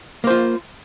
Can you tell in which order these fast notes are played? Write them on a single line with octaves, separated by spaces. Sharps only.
A#3 C5 F4